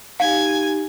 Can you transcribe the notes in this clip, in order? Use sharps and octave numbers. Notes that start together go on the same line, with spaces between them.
D#4 G4 F5 G#5